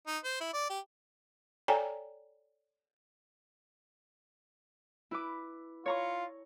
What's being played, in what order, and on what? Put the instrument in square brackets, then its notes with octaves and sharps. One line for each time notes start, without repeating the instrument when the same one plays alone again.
[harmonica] D#4
C5
E4
D5
G4
[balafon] A4 C#5 D5 G5 G#5 A#5
[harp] E4 B4 D6
[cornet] F4 [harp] C#5 A#5 C#6